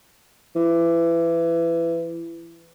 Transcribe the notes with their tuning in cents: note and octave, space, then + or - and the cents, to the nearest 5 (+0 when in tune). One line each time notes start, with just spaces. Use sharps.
E3 +25